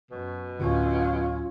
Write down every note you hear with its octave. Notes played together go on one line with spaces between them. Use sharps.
F#2 B2
D2 A2 D3 F#3 C#4 F4